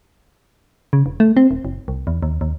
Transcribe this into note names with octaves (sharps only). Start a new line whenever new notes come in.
C#3
E1
A3
C4
D#1
F#1
C2
E2
D#2
D#2